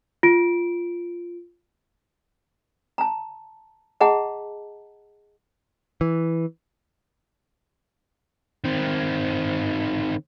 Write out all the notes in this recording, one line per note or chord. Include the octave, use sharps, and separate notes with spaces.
F4 D7
A5 A#5
G#4 D#5 F#5 A5 A#5
E3
D#3 C4